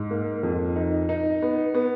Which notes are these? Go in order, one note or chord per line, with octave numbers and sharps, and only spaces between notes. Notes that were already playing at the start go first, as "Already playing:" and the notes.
Already playing: G#2
A#3
F2
D#4
D#4
B3
B3